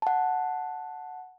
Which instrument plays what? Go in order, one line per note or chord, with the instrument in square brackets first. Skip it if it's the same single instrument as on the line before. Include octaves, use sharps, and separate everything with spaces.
[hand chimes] F#5 A5